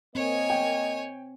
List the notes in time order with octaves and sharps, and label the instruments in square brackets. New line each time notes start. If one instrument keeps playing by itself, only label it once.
[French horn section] A#3 D#5 [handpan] C4 [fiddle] C#5 G#5
[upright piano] G5